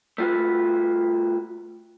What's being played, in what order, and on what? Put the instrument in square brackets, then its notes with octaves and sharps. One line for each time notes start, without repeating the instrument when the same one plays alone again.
[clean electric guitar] A3 F4 F#4 B4